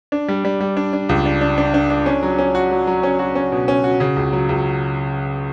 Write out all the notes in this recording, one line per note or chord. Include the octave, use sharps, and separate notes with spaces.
D4
G3
G3
G3
D4
D4
C#2
D4
D4
D4
D4
D4
C#4
F#3
C#4
F#4
F#3
F#3
C#4
F#4
C#4
B2
C#4
F#4
C#3
C#2
F#3
C#2